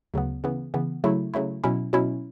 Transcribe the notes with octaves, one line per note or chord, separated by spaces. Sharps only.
D2 C#3 F#3 B3
C#3 E3 B3
C#3 E3 B3
C#3 F#3 A3 E4
C#3 F#3 A3 E4
B2 F#3 C#4 E4
B2 F#3 C#4 E4